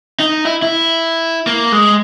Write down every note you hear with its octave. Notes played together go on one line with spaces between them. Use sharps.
D#4
E4
E4
A#3
G#3